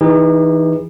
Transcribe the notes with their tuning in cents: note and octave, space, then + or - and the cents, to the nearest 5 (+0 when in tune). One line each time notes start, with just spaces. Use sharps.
E3 -15 D#4 +0 G#4 -45